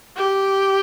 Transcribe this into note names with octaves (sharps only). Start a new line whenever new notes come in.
G4